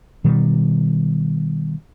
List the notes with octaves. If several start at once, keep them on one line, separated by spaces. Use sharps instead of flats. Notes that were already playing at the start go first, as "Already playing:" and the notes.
B2 D#3 G3